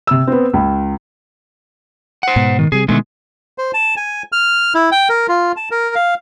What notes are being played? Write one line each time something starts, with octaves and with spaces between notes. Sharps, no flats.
C3 E6
B3 C4
C#2
C5 F#5
G#2 B2
D#3
C3 G3 G#4
B2 D3 D#3 G#3 A3
C5
A5
G#5
F6
E4
G5
A#4
F4
A5
A#4
F5